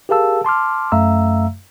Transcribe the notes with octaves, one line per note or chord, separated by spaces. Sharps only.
G4 G#4 A#4 F5 A5 E6
A5 C6 D6 F6
F#2 A3 E5 F5 A#5 E6